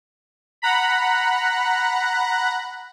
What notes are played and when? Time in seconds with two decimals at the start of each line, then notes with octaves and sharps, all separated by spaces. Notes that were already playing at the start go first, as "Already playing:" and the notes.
0.62 F#5 A#5 B5